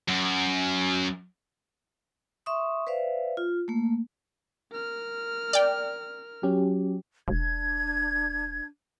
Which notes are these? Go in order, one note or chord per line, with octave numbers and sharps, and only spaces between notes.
F#2
E5 C6 C#6 D#6
B4 C5 D5 E5 F5
F4
A3 A#3
A#4 F6
D5 G5
F#3 C#4 G4
E1 D4 G#6